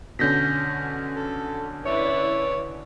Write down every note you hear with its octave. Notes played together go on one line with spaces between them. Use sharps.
B2 D3 C#4 G6 A#6 B6
A4
E4 B4 C#5 D5